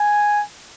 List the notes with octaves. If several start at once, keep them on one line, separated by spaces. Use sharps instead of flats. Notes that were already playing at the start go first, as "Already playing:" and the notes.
Already playing: G#5